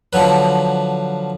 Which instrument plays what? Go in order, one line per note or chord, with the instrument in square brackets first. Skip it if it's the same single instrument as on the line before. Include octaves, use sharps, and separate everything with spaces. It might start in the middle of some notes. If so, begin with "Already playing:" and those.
[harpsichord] D3 F3 F#3 B4